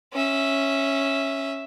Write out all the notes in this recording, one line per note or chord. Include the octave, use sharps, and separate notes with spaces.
C#4 E5